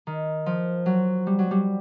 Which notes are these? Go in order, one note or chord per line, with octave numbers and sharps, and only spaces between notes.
D#3
F3
F#3
G3
F#3
G3